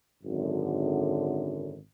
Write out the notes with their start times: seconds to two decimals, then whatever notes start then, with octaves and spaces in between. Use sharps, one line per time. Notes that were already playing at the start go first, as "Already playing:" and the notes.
0.23 G#1 F#2 D3